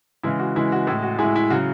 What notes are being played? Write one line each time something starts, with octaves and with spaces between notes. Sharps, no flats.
C#3 E3 G#3 E4
F#4
C#3 E3 G#3 E4
F#4
A2 G#3 E4
F#4
A2 G#3 E4 G#4
E4
C#3 F#3 F#4